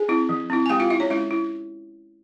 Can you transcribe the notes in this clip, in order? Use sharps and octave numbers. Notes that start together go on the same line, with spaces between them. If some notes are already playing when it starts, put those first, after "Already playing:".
Already playing: G#4 G#5
C4 E4
F3
C4 E4
G#5
G#3 G4 G5
F4 F5
E4 E5
C#4 C#5
G#3 E4 E5
E4